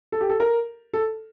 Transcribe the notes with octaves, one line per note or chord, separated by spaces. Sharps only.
A4
G4
A4
A#4
A4